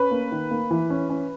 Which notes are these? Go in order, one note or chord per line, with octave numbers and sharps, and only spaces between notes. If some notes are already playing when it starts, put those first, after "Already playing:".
Already playing: C#4 B4
A#3
D#3
A#3
E3
C#4
C#4